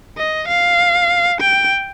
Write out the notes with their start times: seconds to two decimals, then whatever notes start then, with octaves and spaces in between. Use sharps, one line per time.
0.17 D#5
0.48 F5
1.41 G5